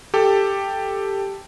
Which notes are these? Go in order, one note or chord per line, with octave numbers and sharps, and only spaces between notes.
G4 A4